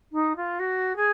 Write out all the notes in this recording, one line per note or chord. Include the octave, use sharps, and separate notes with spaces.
D#4
F4
F#4
G#4